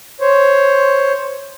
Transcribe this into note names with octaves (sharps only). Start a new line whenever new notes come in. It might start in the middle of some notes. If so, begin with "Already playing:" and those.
C5 C#5